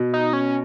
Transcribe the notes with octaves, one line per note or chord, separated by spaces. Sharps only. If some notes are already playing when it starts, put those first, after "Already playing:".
Already playing: B2
D#4
C#4